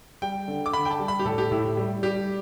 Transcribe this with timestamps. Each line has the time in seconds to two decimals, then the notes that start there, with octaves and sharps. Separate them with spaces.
0.22 G3 G5
0.48 D3
0.66 D6
0.73 D3 B5
0.85 G5
0.91 A5
0.99 G3
1.08 B5
1.19 G4
1.25 A2 A4
1.38 G4
1.51 A2 E4
1.77 G3
2.03 G3 G4